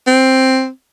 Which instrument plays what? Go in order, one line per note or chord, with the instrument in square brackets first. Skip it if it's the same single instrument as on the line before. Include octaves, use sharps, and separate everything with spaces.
[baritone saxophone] C4